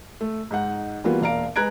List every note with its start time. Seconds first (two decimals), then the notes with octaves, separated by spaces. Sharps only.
0.21 A3
0.51 G#2 D#4 F#5
1.04 E3 G3 A#3 B3 F4 F#4
1.21 E1 A#2 D5 F5 A#5 D7
1.56 G#3 B4 A#5 F#6 G#6 D7